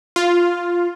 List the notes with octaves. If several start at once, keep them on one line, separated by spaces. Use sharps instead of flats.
F4